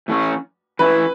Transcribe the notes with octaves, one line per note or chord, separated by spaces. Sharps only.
A2 E3 A3 C#4
E3 C#4 E4 B4